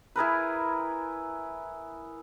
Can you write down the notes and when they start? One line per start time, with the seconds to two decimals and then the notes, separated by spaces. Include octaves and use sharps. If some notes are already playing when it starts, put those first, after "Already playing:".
0.16 E4 G#4 A#4 B4